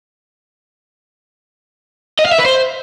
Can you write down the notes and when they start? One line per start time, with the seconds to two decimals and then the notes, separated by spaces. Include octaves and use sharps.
2.19 D#5
2.25 F5
2.32 E5
2.38 B4
2.45 C5